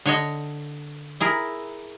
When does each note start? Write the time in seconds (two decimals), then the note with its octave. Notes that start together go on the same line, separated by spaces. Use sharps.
0.06 D3 C#5 D#5
1.20 E4 G#4 A#4